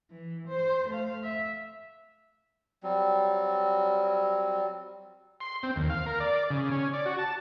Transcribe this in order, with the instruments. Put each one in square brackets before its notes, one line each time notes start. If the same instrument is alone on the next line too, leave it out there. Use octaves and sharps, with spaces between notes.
[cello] E3
C5
A3 F5
E5
[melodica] F#3 G3 C4
[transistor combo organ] C6
C4
D#2
F5
A#4
D5
C#3
C#4
D5
F#4
A5